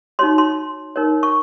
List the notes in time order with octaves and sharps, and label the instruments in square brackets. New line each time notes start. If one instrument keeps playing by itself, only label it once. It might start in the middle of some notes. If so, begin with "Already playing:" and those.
[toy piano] D#4 F#4 C#5 C6
C6
D#4 A#4 C#5
C#6